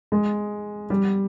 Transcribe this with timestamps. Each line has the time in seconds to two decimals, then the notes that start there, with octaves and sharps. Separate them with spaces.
0.12 G#3
0.90 G3